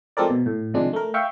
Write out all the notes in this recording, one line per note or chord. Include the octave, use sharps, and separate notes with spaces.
F3 G#3 C4 A4 A#4 D5
B2
A2
C3 D#3 F3 G#3 D4
A3 A#4
E5 F5 G5 C#6